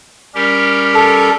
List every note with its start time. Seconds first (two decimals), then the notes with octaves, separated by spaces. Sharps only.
0.35 G3 C#4 G4 A#4
0.95 A4